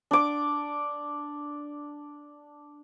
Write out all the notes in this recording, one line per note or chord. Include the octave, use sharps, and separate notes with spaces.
D4 D6